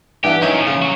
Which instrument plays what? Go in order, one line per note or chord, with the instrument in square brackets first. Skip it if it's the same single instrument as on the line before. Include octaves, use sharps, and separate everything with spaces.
[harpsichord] G2 E3 B3 [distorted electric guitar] G4
[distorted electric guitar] D#3 F#3 [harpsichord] C#4 D#4 E4
[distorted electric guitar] A#2 F3
[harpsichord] C#3
[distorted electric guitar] F#3 F#4